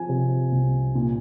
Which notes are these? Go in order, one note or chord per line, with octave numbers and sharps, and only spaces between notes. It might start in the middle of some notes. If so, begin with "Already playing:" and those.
Already playing: F3 G#5
C3
C2
A#2